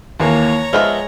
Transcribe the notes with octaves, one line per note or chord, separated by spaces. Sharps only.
D#2 E3 A#3 C#5 A#5
F3 G#3 B3 E5 F6